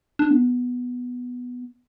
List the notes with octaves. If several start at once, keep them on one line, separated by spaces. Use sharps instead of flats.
D4
B3